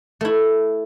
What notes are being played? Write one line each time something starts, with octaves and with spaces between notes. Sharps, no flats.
A3 E4